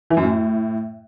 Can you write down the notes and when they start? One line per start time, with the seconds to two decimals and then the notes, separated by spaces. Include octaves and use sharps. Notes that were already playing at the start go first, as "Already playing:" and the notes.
0.10 E3
0.17 F#2
0.23 A2